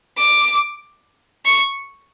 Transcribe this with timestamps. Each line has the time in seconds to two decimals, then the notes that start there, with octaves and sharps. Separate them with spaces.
0.18 D6
1.46 C#6